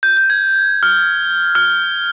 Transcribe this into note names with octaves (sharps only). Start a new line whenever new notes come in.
G6
G6
G#6
F6
F6